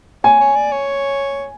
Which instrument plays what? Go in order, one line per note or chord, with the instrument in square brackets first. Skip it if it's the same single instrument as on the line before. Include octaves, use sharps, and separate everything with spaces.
[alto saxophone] C#5 [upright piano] G#5
[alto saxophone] C#5
D5
C#5